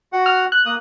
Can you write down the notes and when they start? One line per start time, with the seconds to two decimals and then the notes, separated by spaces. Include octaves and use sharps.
0.13 F#4 F#5
0.26 F6
0.52 F#6
0.66 A#3 D#6